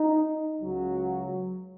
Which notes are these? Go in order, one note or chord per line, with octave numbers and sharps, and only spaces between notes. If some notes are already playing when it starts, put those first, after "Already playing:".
Already playing: D#4
C#2 C#3 F#3